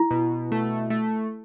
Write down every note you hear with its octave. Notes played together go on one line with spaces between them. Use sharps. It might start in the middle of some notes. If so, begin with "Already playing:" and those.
Already playing: E4
B2
A3
A3